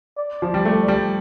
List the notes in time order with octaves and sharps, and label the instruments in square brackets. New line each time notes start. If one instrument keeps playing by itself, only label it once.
[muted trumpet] D5
[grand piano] F3
G3
A3
G3